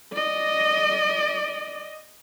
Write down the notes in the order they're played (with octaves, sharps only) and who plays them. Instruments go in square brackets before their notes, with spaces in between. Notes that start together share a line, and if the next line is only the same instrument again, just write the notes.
[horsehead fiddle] D5 D#5